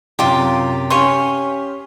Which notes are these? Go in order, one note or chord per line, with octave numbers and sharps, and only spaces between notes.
F#2 C3 F4 G4
C#4 G4 C#5 F5 G#5 C6